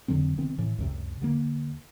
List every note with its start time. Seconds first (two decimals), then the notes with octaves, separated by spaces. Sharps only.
0.08 F2 D3 F#3 C4
0.38 C3 D#3 B3 C4
0.58 A2 E3
0.78 C#2 F#2 C3
1.21 D#2 D3 G3 A#3